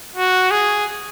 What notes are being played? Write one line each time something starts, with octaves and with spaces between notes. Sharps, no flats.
F#4
G#4